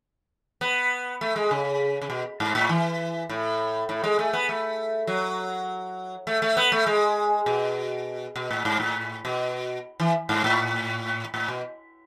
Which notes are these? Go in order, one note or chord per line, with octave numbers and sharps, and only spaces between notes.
B3
A3
G#3
C#3
C#3
B2
G#2
A2
E3
A2
A2
G#3
A3
B3
A3
F#3
A3
A3
B3
A3
G#3
B2
B2
A2
G#2
A2
B2
E3
G#2
A2
A2
B2